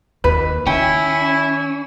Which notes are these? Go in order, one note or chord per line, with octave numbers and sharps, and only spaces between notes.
D#2 B4
D#3 C#4 E4 G5